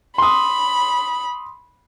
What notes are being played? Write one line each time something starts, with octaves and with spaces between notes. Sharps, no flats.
B5 C6 D#6